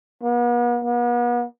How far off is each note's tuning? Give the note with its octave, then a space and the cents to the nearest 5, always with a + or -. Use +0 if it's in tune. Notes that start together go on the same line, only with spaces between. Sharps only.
B3 -45
B3 -40